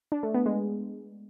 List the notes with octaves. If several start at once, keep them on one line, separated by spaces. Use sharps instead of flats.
D4
A3
B3
G#3